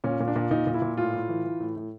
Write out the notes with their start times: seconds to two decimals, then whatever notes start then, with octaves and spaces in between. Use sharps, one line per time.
0.04 A#2 C#4
0.20 A#2
0.28 D4
0.36 A#2
0.51 A#2 D#4
0.67 A#2
0.74 E4
0.82 A#2
0.97 A2 F4
1.14 A2
1.29 E3
1.44 E3
1.60 A2
1.76 A2